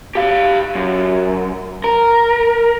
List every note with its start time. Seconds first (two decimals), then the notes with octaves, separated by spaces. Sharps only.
0.15 G4 F5
0.75 F#2
1.84 A#4